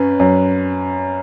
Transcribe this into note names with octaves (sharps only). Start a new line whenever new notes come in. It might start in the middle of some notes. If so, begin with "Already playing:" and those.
Already playing: F#2 C#4 B4
F#2